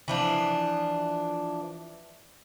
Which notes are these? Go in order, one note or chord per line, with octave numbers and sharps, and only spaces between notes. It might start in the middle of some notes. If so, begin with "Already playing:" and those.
E3 F3 D4